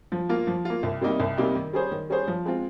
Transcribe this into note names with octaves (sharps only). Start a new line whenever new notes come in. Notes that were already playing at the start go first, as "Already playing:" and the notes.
F3
A#3 F4
F3
A#3 F4
C2
C3 G3 A#3 D#4
C2
C3 G3 A#3 D#4
D#3
G3 C#4 G#4 C5
D#3
G3 C#4 G#4 C5
F3
G#3 C4 F4